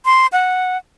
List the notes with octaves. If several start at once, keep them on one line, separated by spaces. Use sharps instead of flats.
C6
F#5